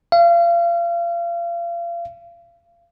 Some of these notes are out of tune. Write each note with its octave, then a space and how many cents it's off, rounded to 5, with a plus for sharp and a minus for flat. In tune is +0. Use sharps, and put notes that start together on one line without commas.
F5 -35